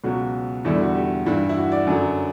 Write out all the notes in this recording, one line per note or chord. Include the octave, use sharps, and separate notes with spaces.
C#2 B2 F#3 F#4
E2 D3 G3 E4
F#4
G4
G2 E3 G3
E4
F#4
D5
F#2 D3 F#3